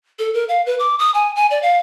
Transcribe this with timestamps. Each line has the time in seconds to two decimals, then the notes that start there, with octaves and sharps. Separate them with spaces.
0.19 A4
0.34 A#4
0.49 F5
0.66 B4
0.79 D6
0.99 D#6
1.14 G#5
1.36 G#5
1.51 D5
1.62 F5